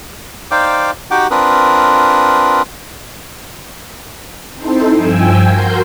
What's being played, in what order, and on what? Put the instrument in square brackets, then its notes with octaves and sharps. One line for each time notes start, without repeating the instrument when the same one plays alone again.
[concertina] D#4 C5 D5 F5 G5 D6
D#4 F#4 G4 F#5 G5 D6
C4 D4 F4 A#4 B4 D#6
[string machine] C4 D#4 E4 A4 C5
G2 F3 G5 G#5 E6
F#4 A#4 C6 G6